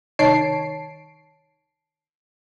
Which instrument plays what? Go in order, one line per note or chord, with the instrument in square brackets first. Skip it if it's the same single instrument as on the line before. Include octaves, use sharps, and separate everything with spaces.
[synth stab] C2 D#3 C#5 A5 C7 D7